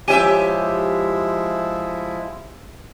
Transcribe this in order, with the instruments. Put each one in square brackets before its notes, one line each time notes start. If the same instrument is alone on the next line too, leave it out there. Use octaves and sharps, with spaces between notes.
[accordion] F3 G#3 E4 [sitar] G4 E5 [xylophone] C#5 G#5 D#7